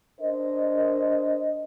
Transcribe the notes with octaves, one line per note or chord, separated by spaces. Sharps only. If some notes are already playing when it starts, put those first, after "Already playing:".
D4 A#4 C5 D#5